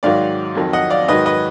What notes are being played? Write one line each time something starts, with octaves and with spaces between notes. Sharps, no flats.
G#2 D#3 F#3 D5 F5
F2 D#3 F#3
D#5 F#5
D5 F5
G#2 D#3 F#3 B4 D#5
B4 D#5